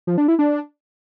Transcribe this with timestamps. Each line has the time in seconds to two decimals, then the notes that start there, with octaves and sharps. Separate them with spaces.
0.07 F3
0.18 D4
0.28 E4
0.39 D4